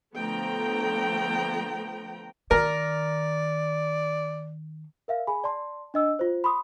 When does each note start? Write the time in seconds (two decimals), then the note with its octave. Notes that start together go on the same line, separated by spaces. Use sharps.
0.15 D3 F3 A3 B3 G5 A#5
2.51 D#3 A#4 D5
5.08 A#4 E5 F5
5.27 G#4 G#5 B5
5.44 D5 A5 C6
5.94 D4 D#5 E6
6.19 F4 C5
6.44 B5 C6 D#6